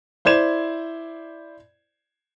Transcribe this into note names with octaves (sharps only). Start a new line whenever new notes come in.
E4 C5 D5 G#6 E7